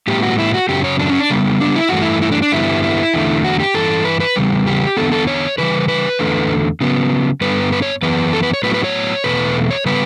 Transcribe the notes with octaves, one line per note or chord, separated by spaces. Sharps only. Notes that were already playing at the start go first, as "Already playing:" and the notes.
A2 G3 B3 G4
F#4
E4
F#4
F#2 C#3 F#3 G4
C#5
D4
C#4
D4
C#3 G3 B3
D4
E4
G2 E3 A3 F#4
E4
E4
D4
D4
G2 D3 G3 B3 E4
E4
E2 D3 A3
F#4
G4
G2 E3 A4
B4
B4
E2 C#3 G3 B3
G4
E2 D3 G3 B3 A4
A4
C#5
C#3 E3 G3 B4
B4
E2 D3 A3
C#3 F#3 B3
G2 D3 G3 B3 B4
B4
C#5
F#2 E3 B3 B4
A4
B4
C#5
A2 F#3 B3 B4
B4
C#5
E2 B2 A3 B4
C#5
C#3 G3 B3 B4